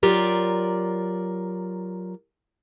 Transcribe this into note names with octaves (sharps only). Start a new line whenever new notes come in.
F#3 F4 G4 A#4 D5